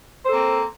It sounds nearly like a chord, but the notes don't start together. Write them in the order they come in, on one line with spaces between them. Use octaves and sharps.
C5 A4 A#3 C4